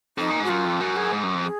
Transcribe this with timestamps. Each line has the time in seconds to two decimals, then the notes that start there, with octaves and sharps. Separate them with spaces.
0.18 F2 D#4
0.30 A#2
0.40 G#2
0.44 F#4
0.49 F#2 F4
0.65 F2
0.80 F#2 F#4
0.96 G#4
1.13 G#2
1.23 F#2
1.34 F2
1.44 G#4